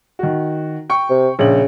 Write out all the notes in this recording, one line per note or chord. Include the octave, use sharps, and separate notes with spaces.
D#3 F#4
G5 C#6
C3
A#1 C#3 F#7